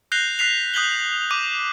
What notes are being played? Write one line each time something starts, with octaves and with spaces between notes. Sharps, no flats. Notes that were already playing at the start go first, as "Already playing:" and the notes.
F#6 G6 A#6 C7 F7 G7
F#6 B6 C7 F7
D#6 F#6 G6 B6 F#7 G7
D6 G6 D#7